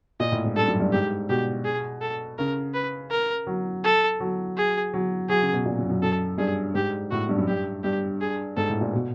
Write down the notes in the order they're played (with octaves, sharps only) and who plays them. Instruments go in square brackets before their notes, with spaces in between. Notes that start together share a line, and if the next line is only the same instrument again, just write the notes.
[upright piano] A#2 [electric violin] D#5
[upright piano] A2
G#2
[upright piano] G2 [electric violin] A4
[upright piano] F#2
G2
[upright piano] G#2 [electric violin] G4
[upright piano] B2 [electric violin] G4
[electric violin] G#4
A4
[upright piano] C#3 [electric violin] A#4
[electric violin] B4
A#4
[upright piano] F#3
[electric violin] A4
[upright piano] F#3
[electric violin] G#4
[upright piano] F#3
[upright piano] F#3 [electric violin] G#4
[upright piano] C#3
B2
A#2
F#2
F#2
[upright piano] F#2 [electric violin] A4
[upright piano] G2 [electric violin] G#4
[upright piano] G#2 [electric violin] G4
[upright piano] A2 [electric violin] F#4
[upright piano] G2
F#2
[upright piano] G2 [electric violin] G4
[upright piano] G2 [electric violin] G4
[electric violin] G#4
[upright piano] G#2 [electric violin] A4
[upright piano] A2
A#2
B2